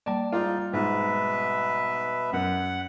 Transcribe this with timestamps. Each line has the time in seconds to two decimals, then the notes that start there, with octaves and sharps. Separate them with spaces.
0.06 G3 A#3 D5 A5
0.32 G#2 D#4 F4 D5
0.73 G#2 B2 B4 E5
2.33 F#2 F#5